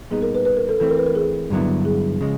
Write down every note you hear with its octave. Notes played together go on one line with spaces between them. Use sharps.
A#2 G3 B3 D#4 G#4
A#4
B4
B4
A#4
A4
E3 A3 C4 A4
A#4
B4
A#4
G#4
G2 D3 F#3 B3 E4
G#4
C#3 F3 G#3